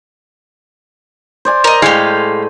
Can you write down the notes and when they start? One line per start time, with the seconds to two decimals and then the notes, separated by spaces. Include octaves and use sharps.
1.45 C5 D5 G#5
1.64 A#4 D#5
1.82 A2 G#3 G4 F5